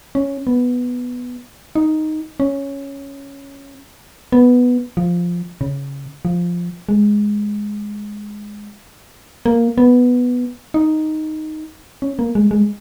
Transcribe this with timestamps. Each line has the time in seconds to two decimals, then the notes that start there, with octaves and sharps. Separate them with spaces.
0.15 C#4
0.47 B3
1.76 D#4
2.40 C#4
4.32 B3
4.97 F3
5.61 C#3
6.25 F3
6.89 G#3
9.46 A#3
9.78 B3
10.74 D#4
12.02 C#4
12.19 A#3
12.35 G#3
12.51 G#3